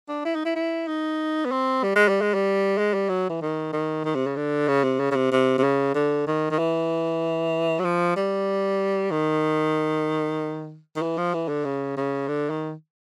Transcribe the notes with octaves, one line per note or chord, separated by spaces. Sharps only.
D4
E4
D#4
E4
E4
D#4
B3
C4
G3
G#3
G3
G#3
G3
G#3
G3
F#3
E3
D#3
D#3
D#3
C3
C#3
D3
C#3
C3
C#3
C#3
C3
C3
C3
C#3
D3
D#3
D#3
E3
F#3
F3
G3
D#3
D#3
E3
F3
E3
D3
C#3
C#3
D3
D#3